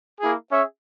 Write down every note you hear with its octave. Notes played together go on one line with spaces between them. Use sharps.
A#3 E4 G#4
C#4 G#4 C#5 E5